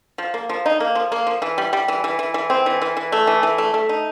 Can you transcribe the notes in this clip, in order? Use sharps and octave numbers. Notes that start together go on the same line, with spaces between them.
F3
A#3
F3
D#4
A#3
F3
A#3
F3
E3
G3
G3
E3
E3
E3
E3
C4
E3
E3
E3
A3
E3
E3
A3
A3
D#4